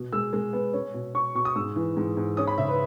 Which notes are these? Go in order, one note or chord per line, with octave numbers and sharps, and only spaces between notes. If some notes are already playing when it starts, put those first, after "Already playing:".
Already playing: B2
G#3 E6
G#3
B3
C#4
B2
C#4 C#6
B2 C#6
D#6
G#2 E6
E3
G#2
G#2
C#4 D#6
B5
C#3 E5
B4